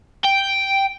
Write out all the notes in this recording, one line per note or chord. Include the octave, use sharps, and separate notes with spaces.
G5